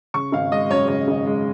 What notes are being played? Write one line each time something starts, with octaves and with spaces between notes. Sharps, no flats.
C#3 C#6
G#1 F5
G#3 D#5
F#2 C#5
C#3 C#5
G#1
G#3